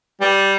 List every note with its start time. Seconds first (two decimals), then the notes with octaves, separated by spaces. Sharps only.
0.21 G3